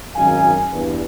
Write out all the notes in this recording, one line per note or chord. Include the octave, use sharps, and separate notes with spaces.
G#1 F#2 D#4 F5 G#5
E2 G2